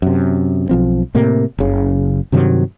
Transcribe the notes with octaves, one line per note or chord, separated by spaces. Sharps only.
F#2 C3
B1 F3 C4
A2 C3 A#3
F#1 C#3
G2 C3 D#3 F#3